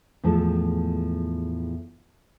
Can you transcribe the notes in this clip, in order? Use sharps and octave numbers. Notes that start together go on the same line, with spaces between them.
E2 A2 F3 G#3 A4